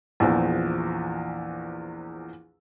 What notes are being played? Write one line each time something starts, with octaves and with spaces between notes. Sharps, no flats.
A#1 E2 E3 F3